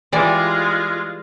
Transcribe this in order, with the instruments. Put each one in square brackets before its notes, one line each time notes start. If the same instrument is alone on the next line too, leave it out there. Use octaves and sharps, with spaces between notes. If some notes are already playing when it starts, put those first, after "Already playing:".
[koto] E3 G3 D5 [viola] G#3 F4